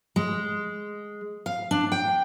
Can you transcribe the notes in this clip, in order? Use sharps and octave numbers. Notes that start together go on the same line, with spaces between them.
G#3
F5
D4
G5